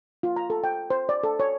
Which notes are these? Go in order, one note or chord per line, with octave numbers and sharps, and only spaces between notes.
F4
A#5
A4
G5
C5
D5
A4
C#5